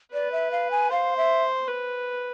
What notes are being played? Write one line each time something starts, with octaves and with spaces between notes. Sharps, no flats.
B4 D5
E5
F5
G#5
C5 F5
E5
B4